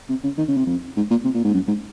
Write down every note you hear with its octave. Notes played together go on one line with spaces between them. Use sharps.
C3
C#3
D#3
C#3
C3
F2
G#2
A#2
C3
A#2
G#2
F#2
G#2